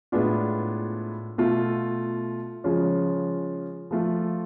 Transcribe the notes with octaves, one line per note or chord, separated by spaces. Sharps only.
A2 G#3 B3 D4 F4
B2 A3 F4
C#3 F3 G#3 C#4 F4
F3 A3 F4